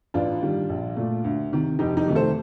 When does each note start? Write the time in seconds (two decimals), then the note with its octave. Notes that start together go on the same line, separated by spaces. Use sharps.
0.14 A1 D4 F4
0.42 G2 D#3 G3
0.69 A#1
0.96 A#2 A3
1.24 D2
1.52 C3 D#3
1.79 F1 D#4 G4
1.97 D#4 G4
2.06 F2 C3 D#3 A3
2.15 A4 C5